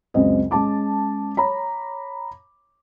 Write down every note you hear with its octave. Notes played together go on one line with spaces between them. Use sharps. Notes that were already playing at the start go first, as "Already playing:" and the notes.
C#2 F#2 C4 D#5
G#3 C#4 A5 D6
C#5 A#5 B5